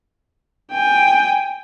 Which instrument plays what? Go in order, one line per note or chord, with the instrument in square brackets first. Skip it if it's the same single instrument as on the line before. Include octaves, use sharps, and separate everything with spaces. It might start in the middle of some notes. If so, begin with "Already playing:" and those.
[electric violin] G5 G#5